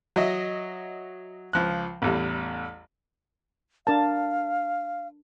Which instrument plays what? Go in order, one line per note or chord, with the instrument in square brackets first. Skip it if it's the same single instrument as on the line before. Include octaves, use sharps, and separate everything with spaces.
[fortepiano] F#3 D#5 E5
C#2 F3 F#6
A1 E2 G3
[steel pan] D4 A#4 A5 [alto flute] F5